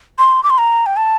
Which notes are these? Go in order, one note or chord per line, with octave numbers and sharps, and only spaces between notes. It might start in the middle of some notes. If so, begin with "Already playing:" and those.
C6
D6
C6
A#5
G5
A5